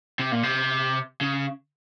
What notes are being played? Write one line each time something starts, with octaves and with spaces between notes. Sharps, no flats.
C3
A#2
C3
C#3